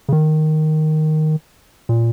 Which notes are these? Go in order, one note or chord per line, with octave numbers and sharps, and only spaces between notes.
C#3
D#3
A#2